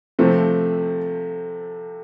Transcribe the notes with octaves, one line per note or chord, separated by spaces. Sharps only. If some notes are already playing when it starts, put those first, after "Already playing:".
C3 F3 A3 C4